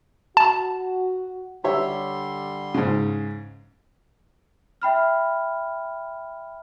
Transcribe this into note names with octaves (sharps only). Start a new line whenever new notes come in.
F#4 A5
D3 G3 G4 C#5 E5 C6
G#2 C#3
E5 G5 B5 F6